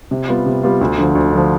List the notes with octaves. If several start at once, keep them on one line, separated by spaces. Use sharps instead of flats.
C3
G3 B3 F4
C3
G3 B3 F4
D2
D3 F3
D2
D3 F3